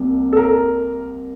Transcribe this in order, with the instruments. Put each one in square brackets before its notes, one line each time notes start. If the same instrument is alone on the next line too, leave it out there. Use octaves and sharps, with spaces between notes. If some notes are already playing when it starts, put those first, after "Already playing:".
Already playing: [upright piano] C2 C3 G3 A#3
A4
A#4